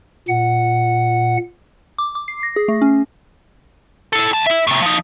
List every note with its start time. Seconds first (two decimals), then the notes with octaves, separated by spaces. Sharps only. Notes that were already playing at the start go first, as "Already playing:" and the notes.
0.29 A#2 F#5
1.98 D6
2.15 D6
2.28 C7
2.43 A#6
2.56 G#4
2.68 A3
2.81 C#4
4.13 E4 A4
4.33 D2 A5
4.46 E4 E5
4.67 A2 C3
4.82 F3 D#4